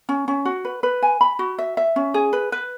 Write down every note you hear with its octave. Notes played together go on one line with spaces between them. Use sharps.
C#4
C#4
F#4
B4
B4
G#5
B5
F#4
E5
E5
C#4
G#4
B4
B4